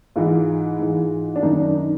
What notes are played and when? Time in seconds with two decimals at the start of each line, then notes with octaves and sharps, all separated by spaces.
0.16 G#2 E3 F4
0.79 G#2 E3
1.36 D4
1.43 F#2 D#3 D#4
1.58 D4
1.75 D#4